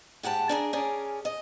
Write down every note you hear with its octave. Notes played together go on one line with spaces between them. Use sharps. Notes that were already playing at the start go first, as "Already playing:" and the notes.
G#2 G4 F#5 A5
D4 G#4 A#4
C#4 G#4 A#4 D5
D#5